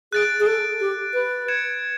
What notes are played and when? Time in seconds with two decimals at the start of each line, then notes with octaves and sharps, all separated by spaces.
0.13 G#4 F#6 A6 D7
0.40 G#4
0.46 A4
0.80 G4
1.14 B4
1.48 G#6 C#7 E7